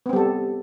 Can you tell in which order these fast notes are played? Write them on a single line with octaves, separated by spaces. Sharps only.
B3 C4 G3 A4